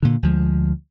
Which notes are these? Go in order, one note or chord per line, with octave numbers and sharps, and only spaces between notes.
A#2 D3
D2 F3 G#3